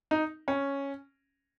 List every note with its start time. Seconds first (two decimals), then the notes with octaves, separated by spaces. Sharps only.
0.11 D#4
0.48 C#4